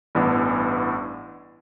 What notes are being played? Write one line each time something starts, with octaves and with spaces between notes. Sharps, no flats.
A1 G2 E3 B3 D4